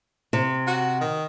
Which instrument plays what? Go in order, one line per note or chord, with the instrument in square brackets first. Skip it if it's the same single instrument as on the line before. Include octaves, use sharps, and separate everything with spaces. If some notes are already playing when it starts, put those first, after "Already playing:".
[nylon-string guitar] C3
[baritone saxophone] F#4
D#3